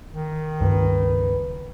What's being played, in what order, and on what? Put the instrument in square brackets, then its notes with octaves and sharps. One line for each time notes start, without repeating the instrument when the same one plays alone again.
[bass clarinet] D#3
[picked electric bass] C#2 G2 [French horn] B4